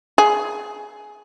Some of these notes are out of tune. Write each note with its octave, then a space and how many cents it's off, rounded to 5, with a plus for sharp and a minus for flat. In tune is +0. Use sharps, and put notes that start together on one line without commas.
G#4 +15